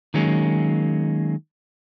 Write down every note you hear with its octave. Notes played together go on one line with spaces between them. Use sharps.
D#3 F#3 G#3 A#3 C#4